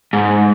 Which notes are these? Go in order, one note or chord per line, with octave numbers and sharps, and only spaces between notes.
G#2